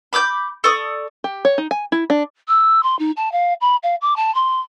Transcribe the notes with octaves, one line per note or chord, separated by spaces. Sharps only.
B5 D6 E6 G6
A4 D5 C#6 D#6
G4
C#5
D#4
G#5
E4
D4
E6
C6
D#4
A5
F5
B5
F5
D6
A5
C6